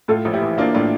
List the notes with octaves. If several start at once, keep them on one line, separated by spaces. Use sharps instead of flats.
A2 F4 A4
A#1
E4 G4
E3
A#3 D4 F4
A2 D4 F4